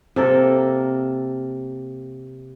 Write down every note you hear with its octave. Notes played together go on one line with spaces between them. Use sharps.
C3 A#3 A4 A#4